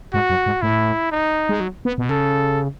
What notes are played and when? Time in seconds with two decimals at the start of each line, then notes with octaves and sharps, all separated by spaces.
0.14 G#2 F#4
0.30 F#2
0.46 G#2
0.62 A2 E4
1.12 D#4
1.49 G#3
1.60 F#3
1.85 B3
1.98 B2
2.09 C#3 A4